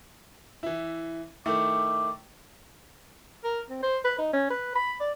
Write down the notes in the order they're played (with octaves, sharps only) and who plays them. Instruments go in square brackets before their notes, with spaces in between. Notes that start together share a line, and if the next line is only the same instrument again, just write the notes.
[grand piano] E3 E4
[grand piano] D#3 A3 E4 [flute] D6
[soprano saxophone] A#4
C4
C5
B4
D#4
C#4
B4
B5
D5